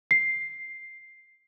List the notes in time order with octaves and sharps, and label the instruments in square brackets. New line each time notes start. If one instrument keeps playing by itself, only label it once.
[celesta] C7